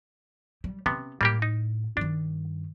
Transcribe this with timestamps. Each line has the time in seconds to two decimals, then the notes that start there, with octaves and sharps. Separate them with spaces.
0.64 G3
0.86 C3 B3 C#4
1.21 A2 G3 A#3 G4
1.42 D#4
1.97 G2 D#3 D4